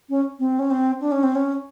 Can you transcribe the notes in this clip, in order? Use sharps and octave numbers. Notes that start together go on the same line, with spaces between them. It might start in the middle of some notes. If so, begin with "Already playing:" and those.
C#4
C4
C#4
C4
D4
C#4
C4
C#4